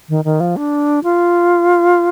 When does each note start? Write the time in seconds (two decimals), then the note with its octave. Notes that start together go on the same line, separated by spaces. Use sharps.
0.09 D#3
0.25 D#3
0.40 F3
0.57 D4
1.04 F4